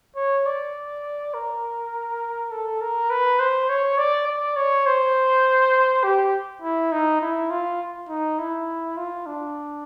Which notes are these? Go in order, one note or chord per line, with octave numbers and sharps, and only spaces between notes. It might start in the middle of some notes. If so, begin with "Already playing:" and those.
C#5
D5
A#4
A4
A#4
B4
C5
C#5
D5
D5
C#5
C5
G4
E4
D#4
E4
F4
D#4
E4
F4
D4